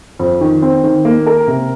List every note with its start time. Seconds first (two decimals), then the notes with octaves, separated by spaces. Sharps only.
0.19 F2
0.41 D#3
0.62 C4
0.84 D#3
1.05 A#3
1.26 A#4
1.47 C3